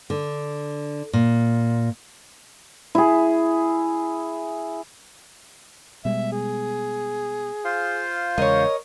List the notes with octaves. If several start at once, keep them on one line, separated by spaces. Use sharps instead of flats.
D3
A#2
E4 G#4
B2 G3 G#3 E5
G#4
F4 C5 F5
E2 C#3 G#3 A#4 C#5 D#5